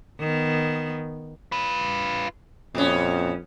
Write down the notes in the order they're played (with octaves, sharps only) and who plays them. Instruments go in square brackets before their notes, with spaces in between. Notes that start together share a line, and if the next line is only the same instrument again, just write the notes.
[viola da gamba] D#3 B3
[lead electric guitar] F4 B4
[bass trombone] F2 [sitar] A#2 B3 C#4